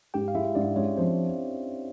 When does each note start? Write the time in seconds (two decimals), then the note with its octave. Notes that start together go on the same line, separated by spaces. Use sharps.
0.14 G#2 G4 G5
0.28 F5
0.35 G#3 E4 E5
0.55 G#2 D4 D5
0.76 G#3 C#4 C#5
0.97 F3 C4 C5